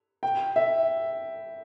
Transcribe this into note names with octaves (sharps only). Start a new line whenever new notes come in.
G5
E5